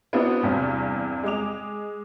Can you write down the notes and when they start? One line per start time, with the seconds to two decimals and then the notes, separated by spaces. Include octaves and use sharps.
0.13 B3 C4 D4 E4 F#4 C5
0.43 E2 G2 C3
1.23 G#3 G#4 D6 F7